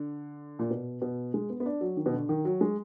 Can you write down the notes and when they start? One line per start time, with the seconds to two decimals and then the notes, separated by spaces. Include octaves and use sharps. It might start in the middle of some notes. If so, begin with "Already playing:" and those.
Already playing: D3
0.59 A#2
0.70 B2
1.02 B2
1.34 G#3
1.50 B3
1.60 B3
1.66 D4
1.81 F#3
1.97 D#3
2.06 B2
2.13 D3
2.29 D#3
2.45 F#3
2.61 G#3